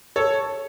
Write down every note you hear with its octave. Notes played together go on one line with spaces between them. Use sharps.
A4 C#5